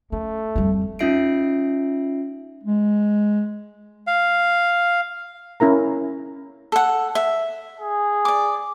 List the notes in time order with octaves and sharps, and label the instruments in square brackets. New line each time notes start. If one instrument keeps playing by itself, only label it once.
[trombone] A3 [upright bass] C#4
[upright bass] F2 G3
[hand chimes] C#4 D#4 F4 E5 C7 D7
[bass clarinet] G#3
[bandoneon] F5
[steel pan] C#4 E4 A#4 A#5
[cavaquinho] A4 F#5
E5
[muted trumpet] G#4
[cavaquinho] D5 D6